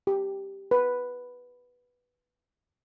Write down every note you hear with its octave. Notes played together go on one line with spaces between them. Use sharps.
G4
B4